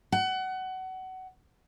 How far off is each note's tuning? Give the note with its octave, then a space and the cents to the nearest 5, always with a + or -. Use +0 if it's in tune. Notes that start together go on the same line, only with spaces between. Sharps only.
F#5 +25